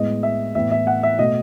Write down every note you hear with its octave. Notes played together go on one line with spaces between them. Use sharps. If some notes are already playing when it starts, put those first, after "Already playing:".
Already playing: A2 G#3 B3 D#5
E5
A2 E3 B3 E5
E5
F#5
E5
B2 A3 D#5